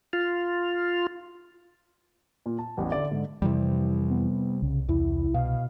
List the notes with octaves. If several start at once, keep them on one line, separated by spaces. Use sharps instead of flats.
F4
A#2
A5
A1 E2
D3 D5 E5
G#2 D3
F2 C3 E3 G3
B3
C2 C#3
E2 E4
B2 F5